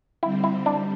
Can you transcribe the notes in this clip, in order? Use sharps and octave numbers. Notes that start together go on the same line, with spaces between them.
D3 G3 C4 E4
E4
G3 D4